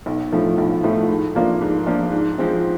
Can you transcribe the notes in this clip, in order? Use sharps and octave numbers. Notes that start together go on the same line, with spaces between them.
B1
A2 F3 A3
B1
A2 F3 A3
G#2
F3 A#3 D4 F4
G#2
F3 A#3 D4 F4
G#2
F3 G#3 C4